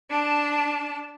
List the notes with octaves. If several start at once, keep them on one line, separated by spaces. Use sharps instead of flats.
D4 A5